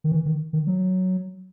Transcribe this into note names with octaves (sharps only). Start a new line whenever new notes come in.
D#3
E3
D#3
D#3
F#3